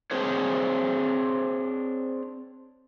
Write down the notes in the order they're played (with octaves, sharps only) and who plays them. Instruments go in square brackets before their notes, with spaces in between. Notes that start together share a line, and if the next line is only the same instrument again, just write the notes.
[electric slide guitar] C4 D4 G#4 C5 C#5